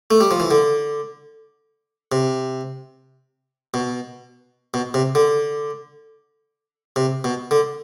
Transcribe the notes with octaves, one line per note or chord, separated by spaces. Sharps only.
A3
G3
F3
E3
D3
C3
B2
B2
C3
D3
C3
B2
D3